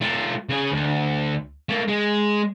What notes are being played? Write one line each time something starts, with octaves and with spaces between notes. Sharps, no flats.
A3 F4
C#3 G#4
D2
A3 A#3
G#3